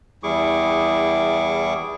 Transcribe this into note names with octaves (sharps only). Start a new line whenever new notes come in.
E2 G3 E4 G#4 C#6 D6